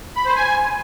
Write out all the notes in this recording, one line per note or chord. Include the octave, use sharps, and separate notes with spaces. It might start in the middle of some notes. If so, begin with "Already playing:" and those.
B5
C5
G#5